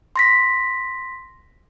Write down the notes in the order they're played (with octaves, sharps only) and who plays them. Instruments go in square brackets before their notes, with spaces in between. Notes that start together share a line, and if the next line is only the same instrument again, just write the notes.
[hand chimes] C6 A#6 B6